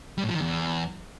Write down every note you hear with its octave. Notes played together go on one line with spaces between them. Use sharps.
G3
A2
F3
D#3
E2